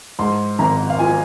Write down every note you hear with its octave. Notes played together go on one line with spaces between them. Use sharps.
G#2 C6
G#1 A#5
F5
F3 G#5